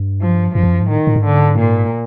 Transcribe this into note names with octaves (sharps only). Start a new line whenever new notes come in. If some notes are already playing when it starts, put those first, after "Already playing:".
Already playing: G2
F3
F#2 F3
F2
F#2
G#2
A2 D#3
A2
G#2
D3
A#2